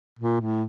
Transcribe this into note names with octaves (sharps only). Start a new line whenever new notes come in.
A#2
A2